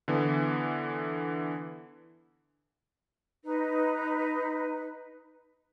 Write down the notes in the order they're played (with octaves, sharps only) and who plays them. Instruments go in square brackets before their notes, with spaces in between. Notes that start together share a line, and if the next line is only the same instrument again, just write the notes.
[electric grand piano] D3 E3 B3
[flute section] D#4 B4